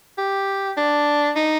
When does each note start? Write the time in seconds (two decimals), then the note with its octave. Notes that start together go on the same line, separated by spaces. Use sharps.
0.18 G4
0.77 D4
1.36 D#4